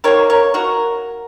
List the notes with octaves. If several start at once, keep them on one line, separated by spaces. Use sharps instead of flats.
D#3 A#3 A#4 C#5
A#4 C#5
F#4 A#4